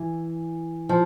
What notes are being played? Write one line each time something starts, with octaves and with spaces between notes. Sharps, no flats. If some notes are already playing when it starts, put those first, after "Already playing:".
Already playing: E3
F3